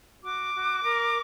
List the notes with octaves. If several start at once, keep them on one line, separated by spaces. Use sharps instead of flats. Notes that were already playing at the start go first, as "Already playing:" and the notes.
F#4 D6
F#4
A#4